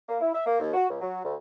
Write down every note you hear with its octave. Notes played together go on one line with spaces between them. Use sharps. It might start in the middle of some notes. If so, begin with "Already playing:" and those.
A#3
E4
E5
A#3
D#2
F#4
C#2
F#3
D2